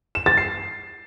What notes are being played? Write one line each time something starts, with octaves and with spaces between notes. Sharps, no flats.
E7
A6
C7